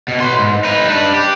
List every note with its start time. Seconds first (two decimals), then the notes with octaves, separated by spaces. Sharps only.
0.08 B2
0.20 B4 C6
0.39 G#2
0.64 D#4 B4
0.88 D4 B4
1.14 G4